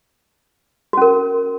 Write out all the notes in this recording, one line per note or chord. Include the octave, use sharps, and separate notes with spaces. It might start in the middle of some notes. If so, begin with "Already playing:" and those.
C#4 F#4 A#4